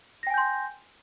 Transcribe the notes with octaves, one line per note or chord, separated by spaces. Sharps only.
G5 G#5 C6 G6 A#6